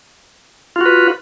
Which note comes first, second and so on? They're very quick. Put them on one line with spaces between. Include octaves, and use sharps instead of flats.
F4 F#4 B4